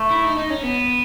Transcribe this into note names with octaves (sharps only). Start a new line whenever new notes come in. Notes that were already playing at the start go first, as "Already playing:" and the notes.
Already playing: A3
E4
D#4
D#4
C#4
B3